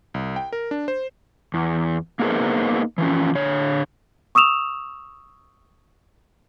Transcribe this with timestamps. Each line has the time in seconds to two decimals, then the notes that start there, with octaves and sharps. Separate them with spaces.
0.14 C2
0.36 G5
0.53 A#4
0.71 D4
0.88 C5
1.54 E2
2.19 A#3 B3 D#4 G#4 A#4 C5
2.98 E3 F3 C#4
3.35 D3 C#5
4.35 C#6 D#6 E6 E7 F7